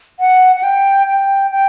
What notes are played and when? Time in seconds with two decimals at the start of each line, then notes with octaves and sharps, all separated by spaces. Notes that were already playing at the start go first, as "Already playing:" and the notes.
0.20 F#5
0.56 F#5
0.63 G5
1.07 G5
1.51 G5